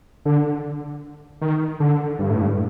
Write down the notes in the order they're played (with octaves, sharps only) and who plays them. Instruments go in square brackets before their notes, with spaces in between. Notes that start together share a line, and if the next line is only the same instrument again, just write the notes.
[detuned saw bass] D3
D#3
D3
G2
A2
G2